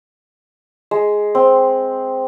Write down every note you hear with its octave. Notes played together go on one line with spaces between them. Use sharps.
G#3
C4